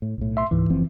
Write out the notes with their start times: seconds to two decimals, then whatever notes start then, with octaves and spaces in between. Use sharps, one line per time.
0.02 A2
0.18 B1 A2
0.37 E5 C6
0.51 C#2 G#2 E3
0.70 F#1 F3 C4